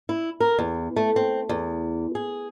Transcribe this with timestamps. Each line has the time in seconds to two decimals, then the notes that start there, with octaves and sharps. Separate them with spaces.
0.09 E4
0.40 A#4
0.58 E2
0.96 A3
1.16 C4
1.49 E2
2.15 G#4